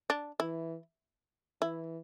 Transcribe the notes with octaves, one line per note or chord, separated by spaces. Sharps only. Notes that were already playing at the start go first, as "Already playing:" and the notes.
D4
E3 E4
E3 E4